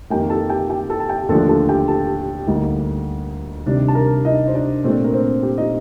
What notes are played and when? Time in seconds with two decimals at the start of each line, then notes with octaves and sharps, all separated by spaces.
0.10 F2 D#3 A#3 G4 G5
0.30 A4 A5
0.50 G4 G5
0.70 G4 G5
0.90 A4 A5
1.00 A5
1.09 G4 G5
1.29 D#2 D3 F3 A3 D4 A4 A5
1.49 A4 A5
1.69 G4 G5
1.88 A4 A5
2.47 D2 D3 G3 A#3 D#4
3.66 C3 D#3 G3 D4
3.88 A5
3.95 A#4 A#5
4.25 D#4 D#5
4.47 C5
4.54 D4 D5
4.84 A#2 A3 C4 D4 C5
5.04 A#4
5.13 C4 C5
5.43 G4
5.58 D#4 D#5